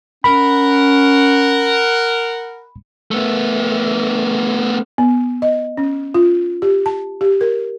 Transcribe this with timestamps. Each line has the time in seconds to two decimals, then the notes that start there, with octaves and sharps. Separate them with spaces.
0.24 C#4 A#4 F#5 B5
3.11 A3 B3
4.98 B3
5.42 D#5
5.77 C#4
6.14 F4
6.62 G4
6.86 A5
7.21 G4
7.41 A#4